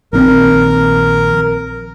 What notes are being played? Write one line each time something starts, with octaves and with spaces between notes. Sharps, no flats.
A#1 D#3 C4 A#4